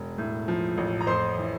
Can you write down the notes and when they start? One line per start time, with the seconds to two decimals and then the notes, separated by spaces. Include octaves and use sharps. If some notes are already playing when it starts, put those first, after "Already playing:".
Already playing: E1
0.18 A2
0.48 F3
0.77 A1
1.01 A#5
1.07 F2 C5 C6
1.38 E3